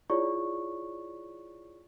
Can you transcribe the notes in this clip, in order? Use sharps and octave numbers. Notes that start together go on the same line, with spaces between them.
E4 F4 G#4 C#5 D5 C#6